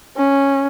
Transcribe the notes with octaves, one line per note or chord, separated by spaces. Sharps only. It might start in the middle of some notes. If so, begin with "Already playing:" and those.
C#4